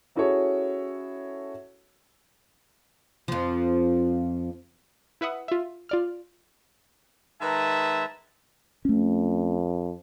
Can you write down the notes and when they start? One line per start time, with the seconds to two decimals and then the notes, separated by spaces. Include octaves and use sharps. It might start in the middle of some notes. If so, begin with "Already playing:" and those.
0.16 C#4 E4 F#4 G#4 A4 C#5
3.28 F2 F3
5.21 E4 B4 E5 F#5 D#6
5.48 F4 E5
5.89 F4 D5 F6
7.42 D#3 G#3 B4 E5 A5 A#5
8.85 F2 A3 C#4